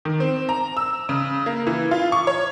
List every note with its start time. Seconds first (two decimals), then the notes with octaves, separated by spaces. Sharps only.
0.05 D#3
0.20 C4
0.49 A#5
0.77 E6
1.09 C#3
1.46 A#3
1.67 E3
1.91 F4
2.12 C#6
2.27 C#5